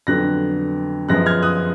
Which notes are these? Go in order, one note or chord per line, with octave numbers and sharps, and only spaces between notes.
F2 D3 F#3 B3 F#6 A#6
F#2 F3 G#3 B3 F#6 A#6
F6 G#6
D#6 F#6